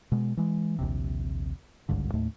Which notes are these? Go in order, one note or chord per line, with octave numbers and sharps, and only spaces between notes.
B2 G#3
E3 G#3
A#1 D#2 C3
G#1 C#2 G2 D3
D#2 A2 A3